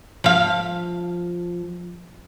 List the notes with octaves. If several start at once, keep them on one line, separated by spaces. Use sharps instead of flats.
F3 F5